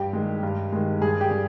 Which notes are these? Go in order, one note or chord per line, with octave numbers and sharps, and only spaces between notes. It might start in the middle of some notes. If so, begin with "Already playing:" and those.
Already playing: G2 G4
D#3 G#3
G2
D#3 G#3
G2 G#4
G4
G3